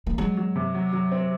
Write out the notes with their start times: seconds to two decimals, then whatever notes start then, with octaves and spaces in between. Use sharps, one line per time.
0.07 A#3
0.18 F#3 G#3
0.37 F#3
0.56 C3
0.75 F#3
0.93 F#3
1.12 C4